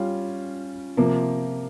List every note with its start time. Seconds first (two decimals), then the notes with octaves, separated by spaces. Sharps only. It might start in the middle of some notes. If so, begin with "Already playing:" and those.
Already playing: G3 C#4 F4
0.97 C3 F3 A#3